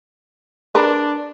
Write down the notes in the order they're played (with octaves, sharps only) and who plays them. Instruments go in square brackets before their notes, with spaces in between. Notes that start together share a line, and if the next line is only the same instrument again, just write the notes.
[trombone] D4 [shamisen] G#4 A#4 B4